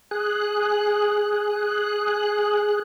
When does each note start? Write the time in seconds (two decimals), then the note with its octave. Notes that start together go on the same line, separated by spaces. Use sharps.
0.11 G#4 F#6